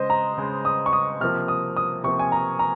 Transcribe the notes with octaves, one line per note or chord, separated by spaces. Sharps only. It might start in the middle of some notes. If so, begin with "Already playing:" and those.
Already playing: C#3 G#3 C5 D#5
A#5
C#3 G#3
D#6
C#6
D#6
C3 F3 A#3 F6
D#6
D#6
C3 F3 A#3 C#6
G#5
A#5
A#5